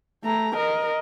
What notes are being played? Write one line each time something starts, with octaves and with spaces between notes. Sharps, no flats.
A3 A#5
A#4 D#5